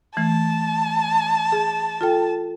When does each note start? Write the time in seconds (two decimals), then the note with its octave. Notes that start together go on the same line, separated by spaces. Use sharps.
0.17 E3 A3 A5
1.52 G#4
2.01 F4 A4 G5